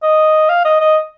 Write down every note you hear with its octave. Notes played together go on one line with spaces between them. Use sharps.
D#5
F5
D#5
D#5